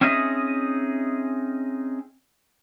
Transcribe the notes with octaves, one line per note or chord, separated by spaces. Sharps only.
C4 C#4 D#4 G#4 D#5 E5